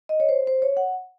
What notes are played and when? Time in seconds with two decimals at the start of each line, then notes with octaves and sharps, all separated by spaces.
0.09 D#5
0.20 C#5
0.29 C5
0.47 C5
0.62 C#5
0.77 F#5